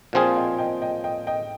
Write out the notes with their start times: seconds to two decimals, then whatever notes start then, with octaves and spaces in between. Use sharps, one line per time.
0.13 A#2 F3 C4 F4 G#4 F5 G#5
0.36 D#5 G5
0.58 D#5 G5
0.81 D#5 G5
1.04 D#5 G5
1.27 D#5 G5